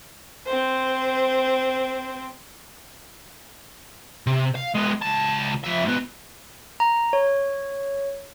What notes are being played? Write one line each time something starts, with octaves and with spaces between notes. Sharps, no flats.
C4 C5
C3
F5
G#3 B3
C#2 A5
F3 E5
G#2 B3
A#5
C#5